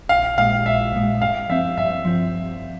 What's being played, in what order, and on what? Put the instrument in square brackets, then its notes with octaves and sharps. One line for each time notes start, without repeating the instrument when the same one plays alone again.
[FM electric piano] A#1 [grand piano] F5
[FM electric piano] A#2 G#3 [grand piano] F5
[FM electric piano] A#1 [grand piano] E5
[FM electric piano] A#2 G#3
[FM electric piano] G2 [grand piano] F5
[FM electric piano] F3 C4 [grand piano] E5
[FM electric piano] G2 [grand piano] E5
[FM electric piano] F3 C4